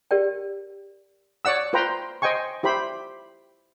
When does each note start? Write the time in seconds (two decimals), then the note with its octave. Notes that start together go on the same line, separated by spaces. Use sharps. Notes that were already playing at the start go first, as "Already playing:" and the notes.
0.11 G4 A#4 D5 G5
1.45 C#5 D5 F#5 E6
1.73 F4 B4 C5 G5 A#5 C6
2.22 C5 D#5 G5 G#5 C#6
2.63 E4 G4 C5 B5